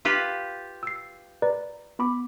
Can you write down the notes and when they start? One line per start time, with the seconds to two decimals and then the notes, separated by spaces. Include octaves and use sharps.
0.05 F4 G4 B4
0.83 E6 C7
1.42 B4 D5 A#5
1.99 B3 B5 D6